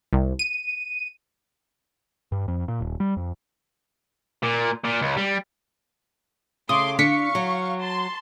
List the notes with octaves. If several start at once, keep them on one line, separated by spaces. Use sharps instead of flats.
C2
D#7
G2
F2
A#2
D#1
G3
F2
A#2
A#2
C#2
G3
C#3 A3 C6 D6 D#6
D3 D4 F5 C#6 B6 C#7
F#3
A5 C6